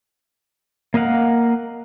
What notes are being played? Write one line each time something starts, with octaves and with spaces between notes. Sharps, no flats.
A#3 A#4 D#5 F5 F#5